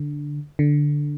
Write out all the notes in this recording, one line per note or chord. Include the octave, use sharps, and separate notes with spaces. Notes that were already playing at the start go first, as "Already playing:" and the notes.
Already playing: D3
D3